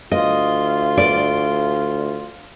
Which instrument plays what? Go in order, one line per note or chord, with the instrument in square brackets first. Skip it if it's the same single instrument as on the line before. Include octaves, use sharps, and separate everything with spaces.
[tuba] D2 [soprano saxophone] F4 [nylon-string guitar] D#5
[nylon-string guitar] D5